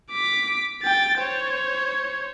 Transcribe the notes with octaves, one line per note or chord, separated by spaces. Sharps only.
D6 B6
G5 A6
C5 C#5